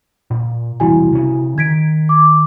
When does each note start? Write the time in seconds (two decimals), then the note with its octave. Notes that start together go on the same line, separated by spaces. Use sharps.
0.30 A#2
0.80 E1 C2 E3 E4 F#4 G#5
1.12 C3 C#4
1.58 D#3 G#6 B6 D7
2.09 D6